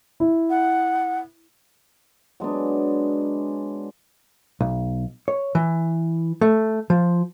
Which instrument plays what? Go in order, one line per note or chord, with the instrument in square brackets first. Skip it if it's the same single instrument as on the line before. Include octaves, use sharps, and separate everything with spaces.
[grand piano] E4
[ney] F#5
[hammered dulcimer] F#3 G#3 B3 D4
[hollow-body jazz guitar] B1
C#5
E3
A3
F3